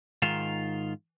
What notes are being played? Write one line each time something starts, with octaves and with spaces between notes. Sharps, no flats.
G#2 D#3 F4